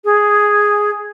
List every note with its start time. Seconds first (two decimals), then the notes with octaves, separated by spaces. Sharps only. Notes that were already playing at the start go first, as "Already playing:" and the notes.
0.04 G#4